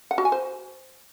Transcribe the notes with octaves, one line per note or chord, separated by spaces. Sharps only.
F#5
F#4
G#5
C5